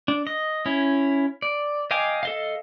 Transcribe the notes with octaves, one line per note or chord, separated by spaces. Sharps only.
D4
D#5
C#4 E4
D5
D#5 F5 G5 G#5 D6
A4 D#5 F5